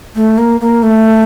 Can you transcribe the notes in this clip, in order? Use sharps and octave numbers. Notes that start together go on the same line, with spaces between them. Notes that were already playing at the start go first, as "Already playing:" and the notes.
A3
A#3
A#3
A3